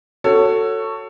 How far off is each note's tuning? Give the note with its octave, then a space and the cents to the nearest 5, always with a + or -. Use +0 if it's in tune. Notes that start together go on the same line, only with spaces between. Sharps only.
F#4 +0 A4 +20 C#5 +0